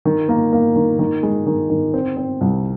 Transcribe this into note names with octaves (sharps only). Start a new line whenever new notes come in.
D#3
A#3
A#3
D#3
D#3
G#3
D#3
D#3
C4
C4
C2